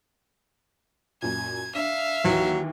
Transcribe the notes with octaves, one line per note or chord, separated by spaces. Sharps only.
F#2 A#2 G#6
D4 E5 F5
D#2 E3 F#3